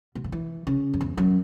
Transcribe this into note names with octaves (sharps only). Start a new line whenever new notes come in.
B2
C#3
E3
C#3
F#2
E2
F#2